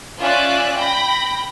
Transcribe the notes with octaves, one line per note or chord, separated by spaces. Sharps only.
C#4 F4 D5 E5 G#5 F#6
G5 B5 A#6